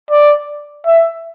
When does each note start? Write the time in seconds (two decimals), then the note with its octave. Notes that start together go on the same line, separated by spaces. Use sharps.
0.10 D5
0.86 E5